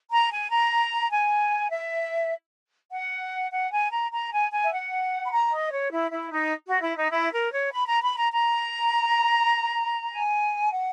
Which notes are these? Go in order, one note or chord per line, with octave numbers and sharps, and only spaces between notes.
A#5
G#5
A#5
G#5
E5
F#5
F#5
G#5
A#5
A#5
G#5
G#5
E5
F#5
B5
A#5
D#5
C#5
E4
E4
D#4
F#4
E4
D#4
E4
A#4
C#5
B5
A#5
B5
A#5
A#5
G#5
F#5